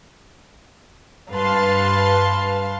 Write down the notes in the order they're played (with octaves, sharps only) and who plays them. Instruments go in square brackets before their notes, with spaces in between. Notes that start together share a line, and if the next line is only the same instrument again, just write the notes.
[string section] G2 B4 F5 A5 C6 A6